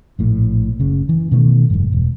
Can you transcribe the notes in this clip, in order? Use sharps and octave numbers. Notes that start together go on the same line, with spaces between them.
A#1 A2
F#1 C#3
E3
B2 D#3 A3
F1 G2
E1